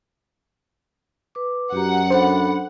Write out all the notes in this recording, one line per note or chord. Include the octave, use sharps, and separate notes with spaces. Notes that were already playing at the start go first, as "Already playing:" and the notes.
B4 D6
F#2 F#4 G4 F#5 A#5
D4 A4 C5 B5